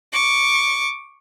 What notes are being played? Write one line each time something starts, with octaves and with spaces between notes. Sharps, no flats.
C#6 D6